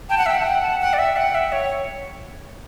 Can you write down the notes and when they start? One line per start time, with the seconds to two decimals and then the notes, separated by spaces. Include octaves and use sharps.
0.09 G5 A5
0.18 F#5
0.26 E5 G5
0.35 F#5 A5
0.45 G5
0.62 A5
0.81 F#5 G5
0.93 D5
0.98 E5
1.16 F#5
1.35 E5
1.52 C#5